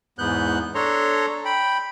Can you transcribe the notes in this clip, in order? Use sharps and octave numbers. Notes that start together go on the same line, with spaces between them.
E2 G#2 B3 F#6 G6
D4 A4 C#5 A#5 C6
G5 B5